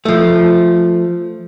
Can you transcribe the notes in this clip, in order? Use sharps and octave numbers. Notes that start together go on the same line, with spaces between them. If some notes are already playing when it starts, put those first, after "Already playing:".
F3 A3